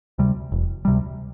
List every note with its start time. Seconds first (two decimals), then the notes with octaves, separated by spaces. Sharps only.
0.18 D2 C3 G3
0.52 E1
0.85 D2 C3 G3